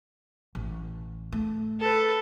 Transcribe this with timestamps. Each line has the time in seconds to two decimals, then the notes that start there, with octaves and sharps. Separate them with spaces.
0.55 A1
1.32 A3
1.80 A4 B4